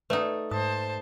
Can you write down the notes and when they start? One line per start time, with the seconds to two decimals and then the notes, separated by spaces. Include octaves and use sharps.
0.10 A3 D#4 B4 D5 F#5
0.51 G#2 C5 A5 D#6